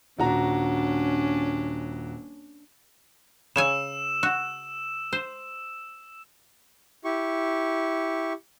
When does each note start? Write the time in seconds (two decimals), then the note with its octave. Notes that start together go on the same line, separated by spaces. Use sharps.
0.19 D#1 C#4 D4 F#4 A#5
3.56 C#3 C#5 G#5 E6 E7
4.23 F#4
5.13 C5
7.05 E4 G4 C#6